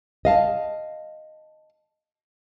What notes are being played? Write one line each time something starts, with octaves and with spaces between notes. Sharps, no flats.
D#5 F5 A5